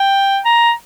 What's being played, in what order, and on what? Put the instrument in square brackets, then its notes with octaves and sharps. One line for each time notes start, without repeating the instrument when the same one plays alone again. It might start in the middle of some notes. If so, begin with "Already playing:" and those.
Already playing: [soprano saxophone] G5
A#5